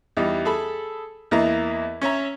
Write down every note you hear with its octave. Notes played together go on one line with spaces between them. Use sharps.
E2 G3 D#4
G#4 A4 B5
E2 A#3 E4 D#5 E5 A#5
C#4 C#5 E5 A#5